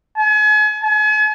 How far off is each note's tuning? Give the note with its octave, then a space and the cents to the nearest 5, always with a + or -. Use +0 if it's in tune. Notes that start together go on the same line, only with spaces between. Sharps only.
G#5 +40
G#5 +40